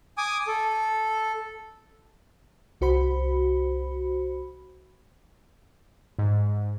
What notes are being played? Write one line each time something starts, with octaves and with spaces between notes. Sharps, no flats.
G#5 D6 D#6
A4
C2 F#4 C5 B5
G#2